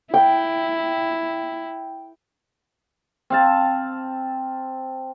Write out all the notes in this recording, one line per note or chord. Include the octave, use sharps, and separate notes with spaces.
E4 G5
C4 F5 A5